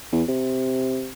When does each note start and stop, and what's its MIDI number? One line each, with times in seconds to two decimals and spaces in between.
0.12 0.23 40
0.29 1.10 48